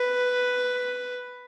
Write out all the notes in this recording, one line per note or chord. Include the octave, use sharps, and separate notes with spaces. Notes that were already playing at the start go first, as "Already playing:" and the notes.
Already playing: B4